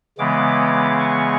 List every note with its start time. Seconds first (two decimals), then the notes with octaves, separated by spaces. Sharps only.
0.18 C#3 E3 G#3 B3 D6
1.00 C#6